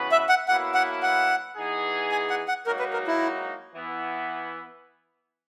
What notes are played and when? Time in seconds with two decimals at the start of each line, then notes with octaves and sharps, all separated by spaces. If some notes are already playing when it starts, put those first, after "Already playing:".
Already playing: C#3 E3 B3 F#4 B4
0.12 E5
0.29 F#5
0.48 B2 F#3 A#3 E4 B4 F#5
0.74 F#5
1.03 F#5
1.57 E3 B3 D#4 G#4
2.11 G#5
2.30 F#5
2.48 F#5
2.66 G#2 F#3 A#3 D#4 F#4 A#4
2.79 B4
2.93 A#4
3.07 E4
3.75 E3 B3 E4